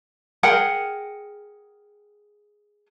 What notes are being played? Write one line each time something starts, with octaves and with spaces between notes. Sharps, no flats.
G#4 A#4 F#5 G5